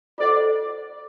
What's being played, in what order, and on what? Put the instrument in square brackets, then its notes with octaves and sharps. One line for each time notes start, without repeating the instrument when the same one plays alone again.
[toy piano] F4 A4 C5 D#5 F#5 [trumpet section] D5